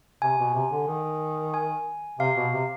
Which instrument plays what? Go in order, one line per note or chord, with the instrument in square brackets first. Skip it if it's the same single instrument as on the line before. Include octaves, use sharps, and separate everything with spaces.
[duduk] C3 [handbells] G#5
[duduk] B2
C3
D3
D#3
[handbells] G#5
[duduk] C3 [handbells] F5
[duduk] B2
C3